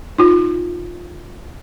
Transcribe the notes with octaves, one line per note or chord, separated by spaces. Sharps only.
D#4 F4